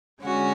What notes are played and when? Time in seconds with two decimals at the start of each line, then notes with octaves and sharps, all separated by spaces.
0.23 D3 G#3 C#4 F#4